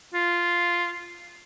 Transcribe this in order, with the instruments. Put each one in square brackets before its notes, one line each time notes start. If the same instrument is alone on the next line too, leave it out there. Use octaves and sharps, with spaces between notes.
[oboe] F4